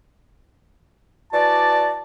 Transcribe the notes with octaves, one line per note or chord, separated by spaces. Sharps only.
E3 F#4 D5 A5